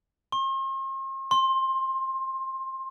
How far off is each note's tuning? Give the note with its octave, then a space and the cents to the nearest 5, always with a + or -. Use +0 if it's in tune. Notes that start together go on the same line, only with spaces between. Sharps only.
C6 +45
C6 +20